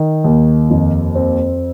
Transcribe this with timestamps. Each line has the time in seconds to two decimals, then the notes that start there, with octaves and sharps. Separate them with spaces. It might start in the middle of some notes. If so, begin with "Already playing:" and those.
Already playing: D#3
0.24 D#2
0.70 F2
1.15 C4